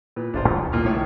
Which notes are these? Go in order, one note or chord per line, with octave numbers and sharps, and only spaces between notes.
A#2 B3
D1 G1 C3 D4 F4 C5
D#2 G#3
B1 A#2 C#3 A#3 F6
A2 D#3 C#5